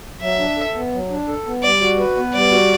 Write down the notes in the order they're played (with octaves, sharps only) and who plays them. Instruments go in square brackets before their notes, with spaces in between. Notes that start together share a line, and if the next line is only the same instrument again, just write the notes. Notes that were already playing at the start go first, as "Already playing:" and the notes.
[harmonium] F#3 [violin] E5
[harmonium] D4
A4
B3
F#3
D4
A4
B3
[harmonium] G3 [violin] D5
[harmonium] F#4
B4
B3
[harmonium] G3 [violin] D5
[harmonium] F#4